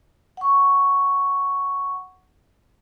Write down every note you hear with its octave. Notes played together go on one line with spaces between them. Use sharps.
F#5 C#6